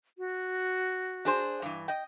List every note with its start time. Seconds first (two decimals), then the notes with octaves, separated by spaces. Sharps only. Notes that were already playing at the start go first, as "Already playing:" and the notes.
0.18 F#4
1.25 D4 G#4 C5
1.62 G2 E3
1.88 D#5 G5